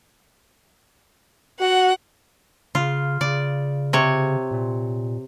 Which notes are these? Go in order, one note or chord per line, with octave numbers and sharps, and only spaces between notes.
F#4 F#5
C#3 F4
C#3 D5
C3 C#5
A#2